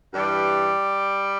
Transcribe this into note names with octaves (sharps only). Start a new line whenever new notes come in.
G2 E3 G3